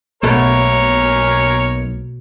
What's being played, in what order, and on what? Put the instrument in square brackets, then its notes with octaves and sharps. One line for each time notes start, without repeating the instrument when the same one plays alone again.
[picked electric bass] B1 A#3 [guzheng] B2 A3 [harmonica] A#4 C#5